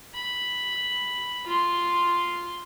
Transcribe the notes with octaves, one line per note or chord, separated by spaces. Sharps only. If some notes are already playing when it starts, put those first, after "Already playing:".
B5
F4 C6